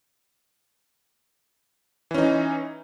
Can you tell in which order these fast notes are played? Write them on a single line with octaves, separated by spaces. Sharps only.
E3 C#4 D#4